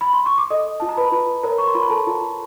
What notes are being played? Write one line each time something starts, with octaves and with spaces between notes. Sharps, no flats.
B5
C6
C#6
D6
A4 D#5 D#6
F4 A5
A#5
B4 B5
F4
A#4 C#5 A#5
C#6
C6
F4 B5
A#5
A4 A5
F4